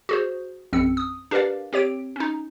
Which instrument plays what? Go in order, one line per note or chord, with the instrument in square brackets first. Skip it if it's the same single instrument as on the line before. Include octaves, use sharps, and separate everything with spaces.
[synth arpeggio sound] F#4 G#4 C5
A#1 F#2 C4 E6 C#7
D#6
D4 G4 A#4 B4 D5 F5
C4 G4 C#5 D7
C#4 D#4